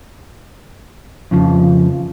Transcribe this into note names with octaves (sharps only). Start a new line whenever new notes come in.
F2 C#3 F3